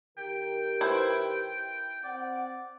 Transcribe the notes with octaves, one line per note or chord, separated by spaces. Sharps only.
D#3 G4 A#4 G5
E4 B4 C5
C4 D5 F#5